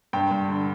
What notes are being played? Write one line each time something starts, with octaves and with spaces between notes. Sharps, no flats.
G2 G5
G2
D3